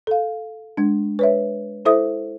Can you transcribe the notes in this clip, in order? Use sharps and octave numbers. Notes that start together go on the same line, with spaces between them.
A4 F5
G#3 D4
B4 C#5 E5
E4 A4 C5 E5 D#6